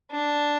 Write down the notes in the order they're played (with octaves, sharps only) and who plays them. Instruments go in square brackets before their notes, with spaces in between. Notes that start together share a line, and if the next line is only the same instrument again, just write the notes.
[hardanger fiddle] D4